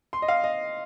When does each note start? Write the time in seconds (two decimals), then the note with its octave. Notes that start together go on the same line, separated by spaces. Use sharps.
0.13 C6
0.22 D#5
0.28 F5
0.44 D#5